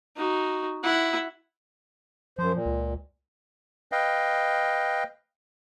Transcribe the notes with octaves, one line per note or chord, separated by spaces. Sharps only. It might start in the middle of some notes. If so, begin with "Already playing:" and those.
D#4 F#4
E4 F#5
F#2 F3 C5
A#2
C#2
B4 D#5 F5 G5